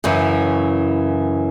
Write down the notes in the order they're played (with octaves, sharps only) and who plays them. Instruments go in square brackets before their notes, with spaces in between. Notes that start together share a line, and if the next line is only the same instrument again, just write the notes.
[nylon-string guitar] F#2 C#3 E3